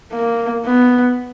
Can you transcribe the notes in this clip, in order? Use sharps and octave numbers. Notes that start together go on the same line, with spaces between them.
A#3
B3